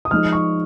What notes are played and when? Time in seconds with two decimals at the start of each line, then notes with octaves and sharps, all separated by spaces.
0.05 D#6
0.11 F3 G#3 D#4 F6
0.33 C#6